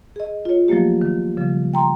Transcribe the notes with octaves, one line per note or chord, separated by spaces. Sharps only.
G#4 D#5
F4 C#5
F3 F#3 A3 A#3 G4
D#3
C#3 F3 G3
G5 A#5 C6